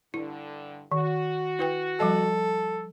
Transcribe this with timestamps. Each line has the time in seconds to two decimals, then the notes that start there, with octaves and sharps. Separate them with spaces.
0.14 G2 D3 E4
0.92 D#3 F#4
1.59 E4 B4 G5
2.00 F3 G3 A4 D#5